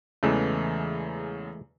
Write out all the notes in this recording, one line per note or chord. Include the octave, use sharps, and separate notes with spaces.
E2 C#3 E3 G#3 A3